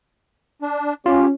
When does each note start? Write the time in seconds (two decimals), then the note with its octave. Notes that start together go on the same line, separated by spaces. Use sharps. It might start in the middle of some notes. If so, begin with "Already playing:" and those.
0.62 D4
1.06 C#4 F4 G4